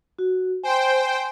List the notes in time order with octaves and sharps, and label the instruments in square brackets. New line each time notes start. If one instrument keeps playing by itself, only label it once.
[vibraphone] F#4
[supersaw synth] C5 G5 [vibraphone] G#5